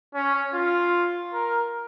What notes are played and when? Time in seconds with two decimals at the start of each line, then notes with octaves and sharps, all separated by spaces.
0.14 C#4
0.54 F4
1.34 A#4